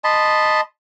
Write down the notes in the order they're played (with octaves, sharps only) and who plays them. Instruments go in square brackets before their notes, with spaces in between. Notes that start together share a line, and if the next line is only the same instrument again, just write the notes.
[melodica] D#5 A5 B5 C6